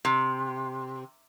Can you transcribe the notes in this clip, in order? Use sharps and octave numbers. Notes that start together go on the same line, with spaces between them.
C3